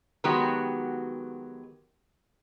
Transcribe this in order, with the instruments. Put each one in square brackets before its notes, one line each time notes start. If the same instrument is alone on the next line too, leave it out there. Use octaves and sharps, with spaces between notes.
[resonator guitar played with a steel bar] D#3 F#3 G#3 B3 F#4 G4